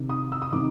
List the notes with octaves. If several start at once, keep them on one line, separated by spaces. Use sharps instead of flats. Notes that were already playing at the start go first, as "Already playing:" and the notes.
Already playing: C3 D#3
D#6
E6
D#6
C3 D#3 D6